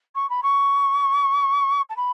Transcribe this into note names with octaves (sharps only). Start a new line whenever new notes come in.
C#6
B5
C#6
A5
B5